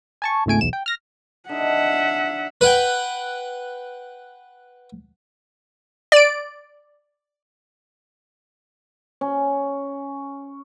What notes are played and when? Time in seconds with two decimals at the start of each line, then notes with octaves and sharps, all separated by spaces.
0.22 G#5 A5 C#6
0.46 G#1 C#2 A3 G#5 D7
0.61 B1 E2 E7
0.73 G5
0.86 F6 A#6
1.49 D3 D#4 D#5 E5 F#5
2.61 B4 F#5 G5
6.12 D5 D7
9.21 C#4